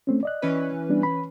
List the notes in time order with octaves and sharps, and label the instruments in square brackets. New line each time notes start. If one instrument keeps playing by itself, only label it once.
[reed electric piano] A3 C4 C#4
D5 D#5 F#6
[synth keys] E3 C#4 B4
[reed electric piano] G3 B3 D4
B5